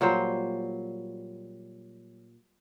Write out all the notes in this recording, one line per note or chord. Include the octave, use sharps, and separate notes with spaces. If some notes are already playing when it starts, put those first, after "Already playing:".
A#2 F#3 G3 C5